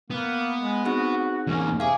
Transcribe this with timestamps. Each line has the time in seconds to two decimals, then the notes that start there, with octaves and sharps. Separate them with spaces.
0.10 A#3 B3
0.58 G#3
0.85 C4 D#4 F#4 G#4
1.47 E2 A#3 C#4
1.80 C3 G#4 F5 G#5 D6